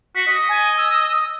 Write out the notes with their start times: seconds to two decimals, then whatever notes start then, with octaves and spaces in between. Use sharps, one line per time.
0.15 F#4 B6
0.27 D#5
0.49 G#5
0.77 E6